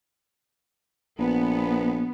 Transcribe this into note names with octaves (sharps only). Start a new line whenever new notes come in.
A#1 B3